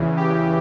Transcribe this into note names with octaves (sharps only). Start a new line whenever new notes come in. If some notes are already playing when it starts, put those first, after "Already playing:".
Already playing: E2 C#3 E3
G4